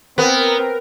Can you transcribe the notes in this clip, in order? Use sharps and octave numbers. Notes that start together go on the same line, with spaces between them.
B3 C4 A#4